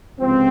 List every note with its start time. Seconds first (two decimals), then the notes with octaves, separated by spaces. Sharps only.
0.19 C#2 C3 F3 C4